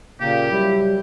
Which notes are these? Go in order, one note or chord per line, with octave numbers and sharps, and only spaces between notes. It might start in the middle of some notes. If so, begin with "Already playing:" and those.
A#2 C#3 A#3 G4
F#3 G3 E4